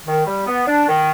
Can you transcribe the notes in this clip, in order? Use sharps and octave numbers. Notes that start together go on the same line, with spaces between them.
D#3
G3
B3
D4
D#3